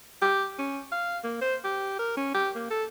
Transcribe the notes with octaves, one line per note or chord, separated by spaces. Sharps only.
G4
C#4
F5
A#3
C5
G4
A#4
C#4
G4
A#3
A4